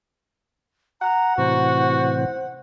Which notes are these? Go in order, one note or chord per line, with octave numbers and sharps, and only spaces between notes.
F#5 A#5
A2 C3 E3 F#4 C5